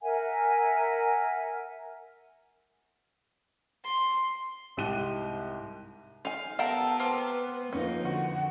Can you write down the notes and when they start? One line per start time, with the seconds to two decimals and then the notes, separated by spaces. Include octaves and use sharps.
0.02 A#4 E5 F#5 G#5
3.84 C6
4.77 C2 G#2 G4 F#6 D#7 G7
6.25 D#4 F5 G#5
6.59 B3 G4 A4 A#4 F5 F#5
7.00 C4 B4 D6 F6
7.73 F2 A#3 C#4 D#4
8.05 D3 F#4 F#5